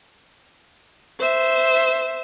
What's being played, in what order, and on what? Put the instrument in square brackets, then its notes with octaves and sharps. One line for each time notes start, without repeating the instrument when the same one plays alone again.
[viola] C5 E5